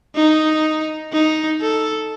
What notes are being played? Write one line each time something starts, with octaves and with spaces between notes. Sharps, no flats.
D#4
D#4
A4